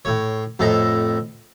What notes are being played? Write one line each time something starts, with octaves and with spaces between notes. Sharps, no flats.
A2 C#5
F2 A2 A4 D#5 A#5